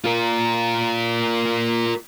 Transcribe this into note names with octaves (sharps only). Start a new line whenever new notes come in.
F4 A#4